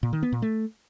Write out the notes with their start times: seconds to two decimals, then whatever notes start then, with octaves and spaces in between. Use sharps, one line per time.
0.03 A#2
0.13 D#3
0.23 B3
0.32 A#2
0.42 A3